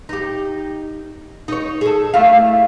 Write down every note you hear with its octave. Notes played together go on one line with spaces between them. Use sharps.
D#4 G4
D#4 C#5
G#4 A4
A3 E4 F5